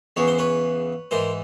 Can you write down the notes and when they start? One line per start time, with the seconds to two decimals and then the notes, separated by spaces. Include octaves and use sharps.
0.16 E2 C#3 E3 C#5
0.28 C5
0.39 B4 C#5
1.11 G#2 E3 A#4 C5